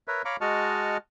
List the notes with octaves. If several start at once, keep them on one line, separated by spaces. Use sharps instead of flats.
A#4 B4 C#5 E5
C#5 F5 A#5 B5 C#6 D6
G#3 F#4 D#5 A5 C#6 F6